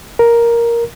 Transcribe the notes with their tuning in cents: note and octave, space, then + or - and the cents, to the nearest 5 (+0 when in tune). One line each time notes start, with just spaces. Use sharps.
A#4 +5